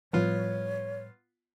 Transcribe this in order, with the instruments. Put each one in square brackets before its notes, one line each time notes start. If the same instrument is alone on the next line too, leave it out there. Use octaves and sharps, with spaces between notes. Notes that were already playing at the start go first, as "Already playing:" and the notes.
[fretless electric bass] A2 F3 G3 [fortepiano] B3 F4 [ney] C#5